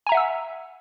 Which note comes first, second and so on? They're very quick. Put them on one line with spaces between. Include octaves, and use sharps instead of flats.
G#5 A#5 E5 F#5 E6